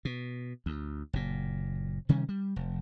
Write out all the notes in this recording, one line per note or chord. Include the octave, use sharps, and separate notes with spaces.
B2
D2
F#1 A#2
C3 D#3 G3 C#4
G3
F1